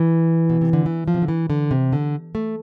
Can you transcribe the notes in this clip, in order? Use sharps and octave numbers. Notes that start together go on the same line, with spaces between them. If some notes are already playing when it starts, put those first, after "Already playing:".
Already playing: E3
B2
C3
D3
E3
F3
C3
D3
E3
D3
C3
D3
A3